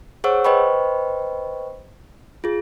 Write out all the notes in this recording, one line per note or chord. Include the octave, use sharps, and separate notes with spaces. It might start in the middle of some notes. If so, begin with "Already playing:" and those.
G#4 C5 C#5 F#5 C#6 E6
B4 C5 D#5 G5 B5 C#6
F4 G#4